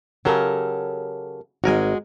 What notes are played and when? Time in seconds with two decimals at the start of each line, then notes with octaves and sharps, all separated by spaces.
0.25 C#3 F#3 G4 A4 A#4
1.64 G#1 G#3 F#4 A#4 G#5